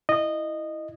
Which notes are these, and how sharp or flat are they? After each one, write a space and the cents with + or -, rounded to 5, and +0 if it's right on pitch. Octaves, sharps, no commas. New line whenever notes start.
E4 +0 D#5 -15